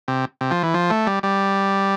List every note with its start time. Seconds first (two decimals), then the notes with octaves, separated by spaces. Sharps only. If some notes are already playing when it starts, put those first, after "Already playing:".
0.08 C3
0.41 C3
0.51 F3
0.63 E3
0.74 F3
0.90 A3
1.07 G3
1.23 G3